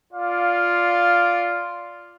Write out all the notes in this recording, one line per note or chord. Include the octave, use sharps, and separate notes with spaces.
F4 D5 F5